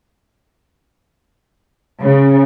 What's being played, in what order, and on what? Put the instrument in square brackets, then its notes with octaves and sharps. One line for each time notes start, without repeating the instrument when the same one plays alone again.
[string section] C#3